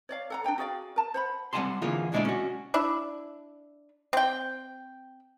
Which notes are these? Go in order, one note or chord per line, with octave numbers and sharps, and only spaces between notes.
C#5 D5 F5
A4 F#5 A#5
D4 C5 G5 A#5
F#4 G#4 D5 F5
A#4 A5
C5 F#5 B5
G3 C4 F#5 G#5 A5 C6
D3 E3 A#3 F4 G#4
D2 B2 G#3 D4 E4 D5
C#4 F#4
D4 E4
C4 G5